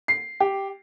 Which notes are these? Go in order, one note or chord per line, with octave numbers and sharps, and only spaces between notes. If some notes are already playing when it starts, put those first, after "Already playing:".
C7
G4